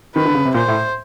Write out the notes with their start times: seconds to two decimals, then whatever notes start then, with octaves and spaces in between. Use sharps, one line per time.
0.15 D#3 B4
0.25 D3
0.35 C#3
0.45 C3
0.54 A#2 C5
0.68 A2